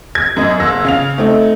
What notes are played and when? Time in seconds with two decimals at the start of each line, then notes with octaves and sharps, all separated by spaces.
0.15 G#6
0.37 F#2 D#5
0.60 F#1 E6 A#6
0.85 C#3 F5 F7
1.18 A3 C4 D#4